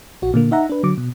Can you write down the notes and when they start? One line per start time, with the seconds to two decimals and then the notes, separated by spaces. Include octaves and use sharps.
0.22 A#1 F#4
0.34 A#2 D3 A#3
0.51 D#4 E5 F#5 A#5
0.69 D4 B4
0.83 D3 F#3 D6
0.98 B2